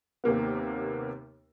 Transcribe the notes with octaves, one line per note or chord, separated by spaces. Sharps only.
D#2 C3 A#3 B3